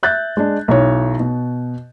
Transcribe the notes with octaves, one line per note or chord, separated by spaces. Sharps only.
E5 F#6 G6 A6
G#3 D4
B1 E4 C#5
B2